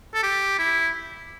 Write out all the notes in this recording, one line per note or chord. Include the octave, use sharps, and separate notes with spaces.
A4
G4
E4